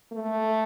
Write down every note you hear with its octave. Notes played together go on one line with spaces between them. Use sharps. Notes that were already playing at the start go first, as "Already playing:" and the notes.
A3